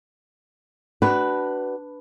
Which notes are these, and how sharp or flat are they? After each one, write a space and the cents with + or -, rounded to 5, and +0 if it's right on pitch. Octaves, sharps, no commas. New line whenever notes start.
D4 +0 F#4 +30 B4 +0